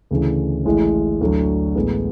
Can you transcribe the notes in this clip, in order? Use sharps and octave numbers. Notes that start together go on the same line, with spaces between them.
D2 C#3 E3
A1 A2 G#3
D2 D3 F#3
A1 A2 G#3 B3